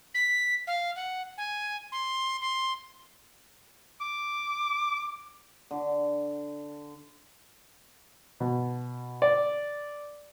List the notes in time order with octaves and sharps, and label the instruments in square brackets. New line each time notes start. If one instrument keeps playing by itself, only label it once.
[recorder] B6
F5
F#5
G#5
C6
C6
[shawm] D6
[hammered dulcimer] D3 D6
[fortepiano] B2
D5